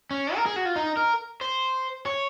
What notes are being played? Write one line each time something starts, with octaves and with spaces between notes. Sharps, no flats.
C#4
A#4
G#4
F#4
F4
D#4
A#4
C5
C#5